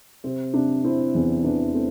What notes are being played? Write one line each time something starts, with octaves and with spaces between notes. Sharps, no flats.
C3 C4
C3 D4
C3 C4 E4
E2
E3 D4
A3 C4